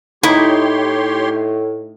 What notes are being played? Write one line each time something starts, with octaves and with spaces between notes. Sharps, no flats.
A2 D#4 E4 G4 C#5 C6